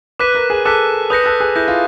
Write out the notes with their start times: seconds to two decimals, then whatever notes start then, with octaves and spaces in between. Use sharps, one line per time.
0.19 B4 D6 F#6 B6 D#7
0.35 A#4
0.50 G#4
0.65 A4 D6 F#6 B6 D#7
1.10 B4 D#6 G6 A#6 C#7
1.26 A4
1.40 G#4
1.55 E4 D#6 G6 A#6 C#7
1.68 F4